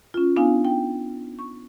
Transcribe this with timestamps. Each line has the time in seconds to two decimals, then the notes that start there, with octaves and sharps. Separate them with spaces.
0.14 C#4 F4
0.36 B3 D4 D#4 F4 F5 G#5
0.65 G5
1.39 C#6